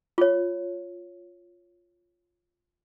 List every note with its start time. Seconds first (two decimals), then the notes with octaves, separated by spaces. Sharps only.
0.18 F4 C#5